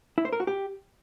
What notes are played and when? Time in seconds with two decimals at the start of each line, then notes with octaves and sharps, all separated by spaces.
0.18 E4
0.25 C5
0.32 A#4
0.40 F#4
0.47 G4